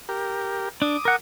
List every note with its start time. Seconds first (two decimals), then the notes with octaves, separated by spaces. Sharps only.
0.09 G4 A#4
0.82 D4 D6 D#6
1.05 A#4 F#5